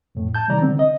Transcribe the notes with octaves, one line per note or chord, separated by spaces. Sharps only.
F2 A2
A5 G6
C3 D#3 G3 D5 A#5
D3 C4
D#5